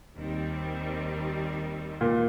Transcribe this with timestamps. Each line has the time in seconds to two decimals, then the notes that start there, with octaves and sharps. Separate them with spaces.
0.16 D#2 D#3 G3 C4
2.01 A#2